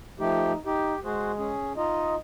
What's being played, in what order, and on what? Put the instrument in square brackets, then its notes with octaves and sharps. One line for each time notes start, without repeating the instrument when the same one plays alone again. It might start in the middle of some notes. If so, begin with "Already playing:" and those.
[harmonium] F3 A3 G4 [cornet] D#4
[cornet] D#4 [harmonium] G4
[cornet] G#3 [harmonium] F#4 G#4 C5
[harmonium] C#4 G#4
[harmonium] D#4 F4 [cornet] D#5